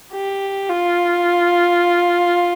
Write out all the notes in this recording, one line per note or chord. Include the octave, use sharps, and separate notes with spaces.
G4
F4